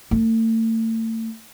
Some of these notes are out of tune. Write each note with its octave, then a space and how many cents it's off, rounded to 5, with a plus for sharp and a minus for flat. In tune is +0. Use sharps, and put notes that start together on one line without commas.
A3 +40